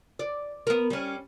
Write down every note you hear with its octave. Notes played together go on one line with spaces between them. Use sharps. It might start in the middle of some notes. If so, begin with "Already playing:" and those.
D5
B3 A#4
G3 C#4